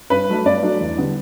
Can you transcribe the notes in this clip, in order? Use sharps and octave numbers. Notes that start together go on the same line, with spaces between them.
G2 B4
F#3 A3 D4
G2 D5
F#3 A3 D4
E2
D3 G3 B3